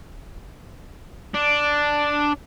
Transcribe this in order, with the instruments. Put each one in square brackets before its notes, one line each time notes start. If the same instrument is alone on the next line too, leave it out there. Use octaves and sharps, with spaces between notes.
[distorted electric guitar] D4